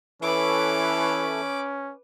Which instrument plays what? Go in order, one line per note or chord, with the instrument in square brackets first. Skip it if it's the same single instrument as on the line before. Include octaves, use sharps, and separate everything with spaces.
[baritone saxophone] E3 [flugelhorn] C#4 [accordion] A4 C#5 E5 [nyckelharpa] B4 D6